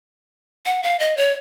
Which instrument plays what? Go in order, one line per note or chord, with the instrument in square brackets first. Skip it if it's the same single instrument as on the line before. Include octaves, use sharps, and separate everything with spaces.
[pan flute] F#5
F5
D#5
C#5